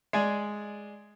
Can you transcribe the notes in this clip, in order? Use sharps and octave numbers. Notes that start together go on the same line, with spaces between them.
G#3 D5 G#5